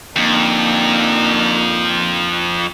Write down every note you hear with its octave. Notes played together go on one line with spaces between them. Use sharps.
F2 D3 A#3 D#4